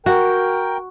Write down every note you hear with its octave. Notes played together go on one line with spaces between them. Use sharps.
F#4 A#4 G5